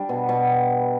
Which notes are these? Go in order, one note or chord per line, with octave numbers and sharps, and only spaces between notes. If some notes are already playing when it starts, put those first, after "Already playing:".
Already playing: G3 D4
B2
B2